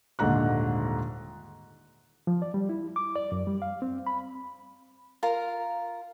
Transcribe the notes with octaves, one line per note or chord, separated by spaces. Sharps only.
D#1 G#2 D3 A#5 F#6
F3
D5
G3
E4
D6
D5
F#2
G3
F5
C4
B5
F4 A#4 A#5